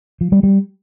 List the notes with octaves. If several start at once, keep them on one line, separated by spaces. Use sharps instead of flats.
F3
G3
G3